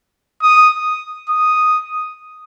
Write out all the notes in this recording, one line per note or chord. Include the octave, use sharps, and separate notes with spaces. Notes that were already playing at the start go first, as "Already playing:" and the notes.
D#6
D#6